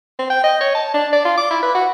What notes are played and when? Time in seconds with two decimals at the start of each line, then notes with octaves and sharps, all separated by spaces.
0.19 C4
0.30 G5
0.44 D#5
0.61 C#5
0.75 A5
0.94 D4
1.13 D5
1.25 F4
1.38 D6
1.51 E4
1.63 B4
1.75 F#4